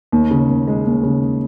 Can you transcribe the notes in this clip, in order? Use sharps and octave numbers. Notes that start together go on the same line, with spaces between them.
D#2
C#3
D#2
G#3
D#2
C#3